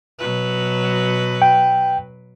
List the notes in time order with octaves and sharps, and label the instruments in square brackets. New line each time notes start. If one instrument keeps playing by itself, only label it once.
[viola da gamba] B2 F#3 B4
[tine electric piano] G5